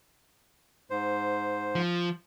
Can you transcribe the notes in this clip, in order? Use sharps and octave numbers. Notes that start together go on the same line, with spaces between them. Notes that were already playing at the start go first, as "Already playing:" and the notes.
G#2 C5
F3